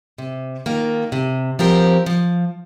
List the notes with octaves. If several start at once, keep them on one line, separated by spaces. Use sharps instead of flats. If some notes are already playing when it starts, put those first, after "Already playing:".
C3
D#3 A#3 F4
C3
F3 C4 G4 A#4
F3